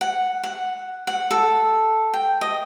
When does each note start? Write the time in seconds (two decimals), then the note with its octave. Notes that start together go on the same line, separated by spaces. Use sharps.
0.01 F#5
0.43 F#5
1.07 F#5
1.31 A4
2.14 G5
2.41 D#5